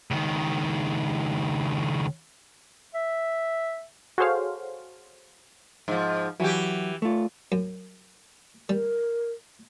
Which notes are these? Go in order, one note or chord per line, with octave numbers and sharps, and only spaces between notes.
C#2 D#3
E5
F#4 G#4 A4 C5 C#5 F5
G#2 F3
E3 F#3 F#4 G4
A3 F4
F#2
G3 A#4